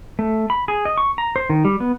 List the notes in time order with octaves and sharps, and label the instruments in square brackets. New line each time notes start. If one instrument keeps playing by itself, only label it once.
[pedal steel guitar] A3
B5
G#4
D#5
C#6
A#5
C5
D#3
G3
B3